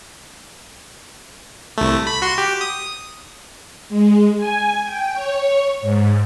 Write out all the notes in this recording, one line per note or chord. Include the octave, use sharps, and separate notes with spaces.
C2 A3
B5
F#4 C6
G4
D#6
G#3
G#5
G5
C#5
G#2